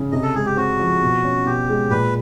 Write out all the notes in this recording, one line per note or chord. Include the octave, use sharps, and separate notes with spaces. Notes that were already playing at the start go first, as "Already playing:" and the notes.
Already playing: C#3
C3 D#5
A4
G#3 G#4
G4
C4 F#4
F3
B2
C#4
B2 G4
G#3
A#2 B4